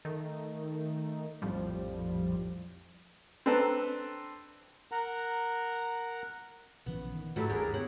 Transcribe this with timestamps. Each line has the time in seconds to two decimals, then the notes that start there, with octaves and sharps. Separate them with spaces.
0.05 D#3 A3 D#4
1.42 A#1 F2 A2 F3 G3
3.46 C4 D4 A4 B4 A#5
4.92 A#4 F#5 A#5
6.86 A#1 C#3 E3 B3
7.15 D#3
7.36 G#2 F#3 G3 A3 E4
7.49 G1 D#2 D4 G4 G#4 A#4
7.74 C3 B3 G4 C#5 F#5